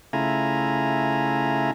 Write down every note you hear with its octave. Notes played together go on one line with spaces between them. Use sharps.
C#3 A3 E4 F4 G#5 A#5